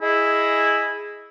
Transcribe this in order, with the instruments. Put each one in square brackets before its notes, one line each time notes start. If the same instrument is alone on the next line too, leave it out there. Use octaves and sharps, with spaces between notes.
[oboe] E4 [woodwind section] G#4 D#5